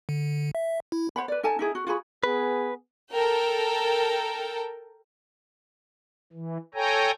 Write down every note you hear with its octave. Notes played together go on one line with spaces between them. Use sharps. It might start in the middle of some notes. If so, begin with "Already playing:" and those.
D3
E5
E4
C5 F#5 B5
B4 D5
D#4 A4 G#5 A5
D#4 E4 G#4
F#4
F4 F#4 G#4 B5
B3 G#4 B4
A4 A#4 G5
E3
A4 C#5 G5 G#5 A#5